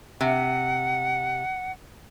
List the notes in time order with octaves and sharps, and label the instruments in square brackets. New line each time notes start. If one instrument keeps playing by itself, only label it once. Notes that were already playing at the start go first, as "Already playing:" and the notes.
[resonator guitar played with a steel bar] C3 [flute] F#5